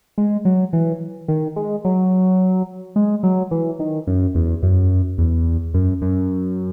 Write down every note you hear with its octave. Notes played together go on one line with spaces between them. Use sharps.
G#3
F#3
E3
D#3
G#3
F#3
G#3
F#3
E3
D#3
F#2
E2
F#2
E2
F#2
F#2